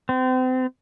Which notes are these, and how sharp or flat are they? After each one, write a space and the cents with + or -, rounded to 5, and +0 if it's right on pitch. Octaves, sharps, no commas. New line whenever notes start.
C4 -35